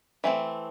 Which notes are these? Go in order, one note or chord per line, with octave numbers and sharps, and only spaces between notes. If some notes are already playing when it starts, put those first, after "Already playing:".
E3 A3 C4